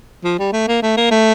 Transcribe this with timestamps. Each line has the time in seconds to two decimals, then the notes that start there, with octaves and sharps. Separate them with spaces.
0.24 F3
0.39 G3
0.53 A3
0.68 A#3
0.82 A3
0.97 A#3
1.11 A3